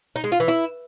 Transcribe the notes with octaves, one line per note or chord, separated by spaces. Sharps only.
D#4
G#3
F4
E3
E4